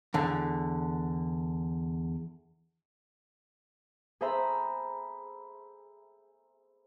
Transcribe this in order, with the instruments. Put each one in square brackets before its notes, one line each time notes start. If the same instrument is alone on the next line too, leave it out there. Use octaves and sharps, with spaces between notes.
[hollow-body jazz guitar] E2 D3
[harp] G#4 A4 C5 E5 A#5 B5